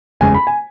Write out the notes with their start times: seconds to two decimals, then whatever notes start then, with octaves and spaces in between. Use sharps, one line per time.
0.21 F#1 E2 C#3 G#3 G#5
0.34 B5
0.47 G#5